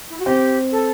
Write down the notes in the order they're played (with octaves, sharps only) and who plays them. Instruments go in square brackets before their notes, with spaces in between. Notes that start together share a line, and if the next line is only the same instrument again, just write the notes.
[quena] E4
F#4
[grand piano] C4 [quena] G4
[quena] A4